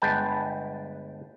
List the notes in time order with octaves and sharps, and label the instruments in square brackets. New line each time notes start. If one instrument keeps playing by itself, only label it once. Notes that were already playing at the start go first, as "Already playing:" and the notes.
[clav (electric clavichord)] G1 G#3 B4 G5 A5